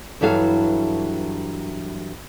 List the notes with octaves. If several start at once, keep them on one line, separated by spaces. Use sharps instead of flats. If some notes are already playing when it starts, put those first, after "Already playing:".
G2 E3 F#3 A4 F5